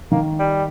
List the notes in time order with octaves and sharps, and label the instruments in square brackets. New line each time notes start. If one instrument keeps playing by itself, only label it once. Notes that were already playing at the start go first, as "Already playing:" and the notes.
[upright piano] D#3 [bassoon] A#3
[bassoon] G3